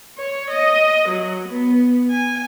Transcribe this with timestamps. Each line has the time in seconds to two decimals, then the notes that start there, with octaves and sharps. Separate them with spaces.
0.18 C#5
0.50 D#5
1.08 F#3
1.48 B3
2.11 G#5